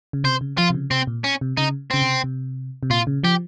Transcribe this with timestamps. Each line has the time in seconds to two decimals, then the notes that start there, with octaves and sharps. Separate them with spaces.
0.13 C#3
0.24 C3 C5
0.41 C#3
0.58 F3 F4
0.70 C3
0.74 C#3
0.91 C3 C4
1.07 A#2
1.24 C#4
1.41 C3
1.57 C#3 D#4
1.91 C#3 C4
2.02 C3
2.24 C3
2.83 C3
2.90 A#2 F4
3.07 C#3
3.23 F3 G4